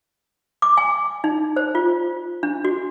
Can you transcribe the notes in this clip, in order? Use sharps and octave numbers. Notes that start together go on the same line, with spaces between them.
D6
G#5
D#4
C5
F4
D4
F#4